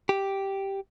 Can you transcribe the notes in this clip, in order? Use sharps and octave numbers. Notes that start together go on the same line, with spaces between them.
G4